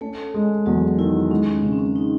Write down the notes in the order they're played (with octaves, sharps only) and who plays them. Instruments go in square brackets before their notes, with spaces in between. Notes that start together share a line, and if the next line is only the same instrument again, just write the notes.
[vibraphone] A3 A4 [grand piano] C#4
[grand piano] G#3
[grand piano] E2 [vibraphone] F#3 F#4
[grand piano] D#3 [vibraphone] E4
[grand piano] G#3 [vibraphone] C#4
[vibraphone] C#4
[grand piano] C#3 [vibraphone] C4
[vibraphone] C4
C#4
D#4